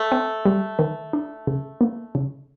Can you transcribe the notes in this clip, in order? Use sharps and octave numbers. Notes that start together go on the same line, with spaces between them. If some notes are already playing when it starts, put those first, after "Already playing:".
Already playing: A3
C4
G3
D#3
D4
C#3
A#3
C#3